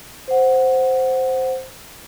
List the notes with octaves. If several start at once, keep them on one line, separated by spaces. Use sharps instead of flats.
C5 F#5